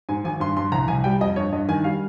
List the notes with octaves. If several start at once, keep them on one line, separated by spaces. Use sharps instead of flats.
G#2 G#5
G#1 G#5
G2 C6
G2 C6
C2 A#5
C2 G#5
G3 G5
F2 D#5
G2 C#5
G2 D#5
D#3 G#5
G3 F5